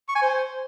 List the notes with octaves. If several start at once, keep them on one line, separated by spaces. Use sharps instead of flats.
C#6
G#5
C5